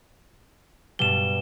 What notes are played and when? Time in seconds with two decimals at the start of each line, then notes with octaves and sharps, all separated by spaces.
0.99 G2 B2 G3 E7 G7